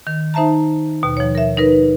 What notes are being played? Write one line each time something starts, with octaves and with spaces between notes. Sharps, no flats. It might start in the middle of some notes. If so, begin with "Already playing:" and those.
D#3
D#4 C5 E5 A5 A#5
D#2 B2
F3 C#5
A#4 E5
D#4 A#4 B4